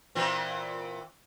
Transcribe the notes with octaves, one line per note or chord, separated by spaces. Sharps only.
A#2 E3 C4